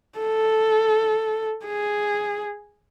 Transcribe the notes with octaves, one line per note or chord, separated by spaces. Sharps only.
A4
G#4